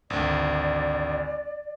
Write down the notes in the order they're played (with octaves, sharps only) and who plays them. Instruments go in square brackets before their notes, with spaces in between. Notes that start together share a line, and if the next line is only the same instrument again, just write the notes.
[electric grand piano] G#1 D2 [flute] D5